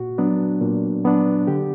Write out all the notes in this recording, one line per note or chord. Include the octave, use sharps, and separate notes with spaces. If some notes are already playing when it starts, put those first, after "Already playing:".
Already playing: A#2 F#4
F#3 B3 D4
A#2
F#3 B3 D4
D3 G4